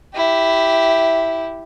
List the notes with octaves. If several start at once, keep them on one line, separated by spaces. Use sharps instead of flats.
E4 G4